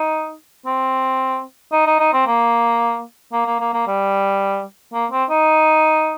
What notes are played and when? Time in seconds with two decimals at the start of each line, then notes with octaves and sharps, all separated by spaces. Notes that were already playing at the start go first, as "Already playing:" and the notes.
Already playing: D#4
0.66 C4
1.72 D#4
1.87 D#4
1.99 D#4
2.13 C4
2.27 A#3
3.33 A#3
3.46 A#3
3.60 A#3
3.73 A#3
3.87 G3
4.93 A#3
5.11 C4
5.30 D#4